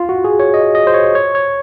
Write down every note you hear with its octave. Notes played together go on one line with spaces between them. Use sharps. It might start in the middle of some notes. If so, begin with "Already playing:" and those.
Already playing: F4
F#4
G#4
C#5
D#5
D#5
C5
C#5
C#5
C#5